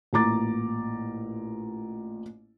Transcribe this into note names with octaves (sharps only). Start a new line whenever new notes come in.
A1 A#2 A#5 D6 A6